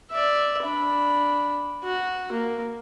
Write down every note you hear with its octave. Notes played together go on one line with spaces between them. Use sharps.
D5 E5
D4 B5
F#4
A#3